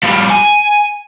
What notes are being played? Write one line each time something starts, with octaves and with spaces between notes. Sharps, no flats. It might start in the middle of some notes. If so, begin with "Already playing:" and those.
F3 G3
G#5